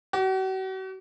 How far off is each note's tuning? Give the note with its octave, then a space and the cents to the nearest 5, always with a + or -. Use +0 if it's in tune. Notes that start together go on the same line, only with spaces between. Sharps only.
F#4 +40